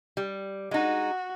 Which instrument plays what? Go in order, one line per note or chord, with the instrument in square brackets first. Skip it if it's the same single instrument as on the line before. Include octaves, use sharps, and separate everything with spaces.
[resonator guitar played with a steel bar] G3
[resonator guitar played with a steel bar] G#3 D#4 [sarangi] F#4